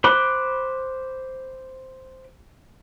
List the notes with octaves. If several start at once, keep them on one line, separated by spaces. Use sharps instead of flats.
C5 B5 D6 F#6